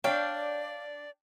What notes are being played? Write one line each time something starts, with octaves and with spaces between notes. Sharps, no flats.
D4 C#5 D5 F5 G5